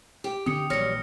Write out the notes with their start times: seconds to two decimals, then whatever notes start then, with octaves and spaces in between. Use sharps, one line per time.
0.24 G4
0.46 D3 C4 G4 D#6 C#7
0.70 A#1 E3 F#3 G3 F6 A#6 C#7